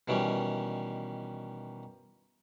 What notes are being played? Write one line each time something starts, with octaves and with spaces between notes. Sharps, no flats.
B2 D#3 E3 G3 C#4 G4